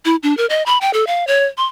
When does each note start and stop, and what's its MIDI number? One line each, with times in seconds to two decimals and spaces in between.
0.05 0.16 64
0.23 0.36 62
0.37 0.46 70
0.50 0.65 75
0.66 0.78 83
0.81 0.91 79
0.94 1.07 69
1.07 1.27 77
1.27 1.46 73
1.58 1.65 84